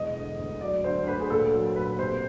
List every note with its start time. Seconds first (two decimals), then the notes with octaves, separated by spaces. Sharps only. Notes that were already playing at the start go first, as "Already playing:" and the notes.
Already playing: E1 D#5
0.15 D3
0.38 D2
0.61 F#3 D5
0.84 D2 C5
1.07 D2 B4
1.20 G#4
1.30 A#2 A4
1.53 F#3
1.76 A#2 B4
1.99 C3 C5